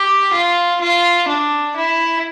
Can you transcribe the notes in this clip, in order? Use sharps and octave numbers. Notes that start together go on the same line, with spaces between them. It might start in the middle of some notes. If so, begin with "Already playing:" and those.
Already playing: G4
F4
F4
D4
E4